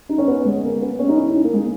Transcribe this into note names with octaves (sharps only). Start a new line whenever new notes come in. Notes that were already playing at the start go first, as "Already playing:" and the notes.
D#4
C#4
B3
G#3
A#3
B3
C#4
D#4
E4
D#4
A#3
G#3